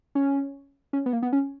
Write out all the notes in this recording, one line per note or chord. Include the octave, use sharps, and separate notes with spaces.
C#4
C#4
B3
A#3
B3
C#4